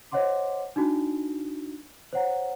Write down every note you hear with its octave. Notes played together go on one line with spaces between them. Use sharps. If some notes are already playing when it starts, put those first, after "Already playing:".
C5 C#5 D#5 F#5 C6 D6
D4 D#4 F#4
C5 C#5 F#5 A#5